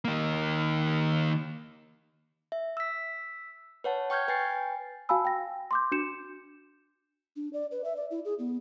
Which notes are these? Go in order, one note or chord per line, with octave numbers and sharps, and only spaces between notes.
D#3 A#3
E5
E6 B6
B4 C#5 F#5 A5
G5 C#6 F6 G6 G#6
B4 G5 G#5 A6 C7
F#4 F5 G#5 A5 B5 E6
G5 A#6
C6 D6 G6
D4 F#4 G6 C#7 E7
D4
D5
B4
E5
D5
E4
G#4
B3